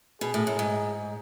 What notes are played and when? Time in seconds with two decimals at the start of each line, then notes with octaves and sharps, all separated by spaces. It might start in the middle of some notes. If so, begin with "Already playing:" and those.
0.21 B2 G#4
0.34 A2
0.47 F#2
0.59 G#2